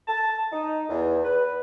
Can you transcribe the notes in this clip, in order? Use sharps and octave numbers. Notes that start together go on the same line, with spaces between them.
A5
D#4
E2
B4